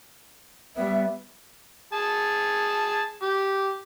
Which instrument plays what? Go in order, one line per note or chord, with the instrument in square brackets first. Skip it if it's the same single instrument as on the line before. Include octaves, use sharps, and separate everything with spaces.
[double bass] G3 B3 [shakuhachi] E5
[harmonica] G#4 A5
G4